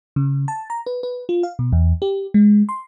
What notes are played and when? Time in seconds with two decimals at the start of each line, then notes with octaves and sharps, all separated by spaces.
0.16 C#3
0.48 A5
0.70 A#5
0.86 B4
1.03 B4
1.29 F4
1.43 F5
1.59 B2
1.72 E2
2.02 G4
2.34 G#3
2.69 C6